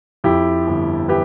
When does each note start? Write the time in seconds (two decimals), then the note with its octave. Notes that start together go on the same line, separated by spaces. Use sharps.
0.24 F2 E4 G4
0.67 G1
1.08 E3 G4 B4